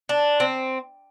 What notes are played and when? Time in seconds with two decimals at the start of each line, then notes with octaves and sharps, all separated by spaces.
0.09 D4
0.40 C4